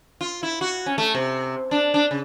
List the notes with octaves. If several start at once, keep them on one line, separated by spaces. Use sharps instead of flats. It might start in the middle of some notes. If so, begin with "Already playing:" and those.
F4
E4
F#4
C#4
A3
C3
D4
D4
C#3